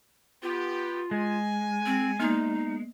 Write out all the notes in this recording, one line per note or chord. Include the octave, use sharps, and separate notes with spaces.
B3 F4 G4
G#3 G#5
C4
A#3 B3 D#4